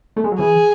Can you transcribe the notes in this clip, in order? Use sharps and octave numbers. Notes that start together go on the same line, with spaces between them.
A3
G#3
F#3
E3 G#4